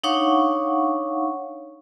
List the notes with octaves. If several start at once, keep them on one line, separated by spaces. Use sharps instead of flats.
D4 D#4 C#5 F5 F#5 C#6